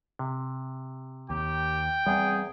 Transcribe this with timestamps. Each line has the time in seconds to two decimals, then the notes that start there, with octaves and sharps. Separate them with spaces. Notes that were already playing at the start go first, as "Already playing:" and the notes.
0.19 C3
1.30 D#2 G4 G5
2.06 E2 G3 C4 G#4